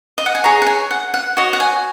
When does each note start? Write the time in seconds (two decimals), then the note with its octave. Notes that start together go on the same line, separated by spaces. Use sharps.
0.18 D#5
0.26 F#5
0.35 G#5
0.44 G#4 C#5 A#5
0.62 F#5
0.66 G#5
0.91 F#5
1.14 F#5
1.37 F#4 C#5 D#5
1.53 F#5
1.60 G#5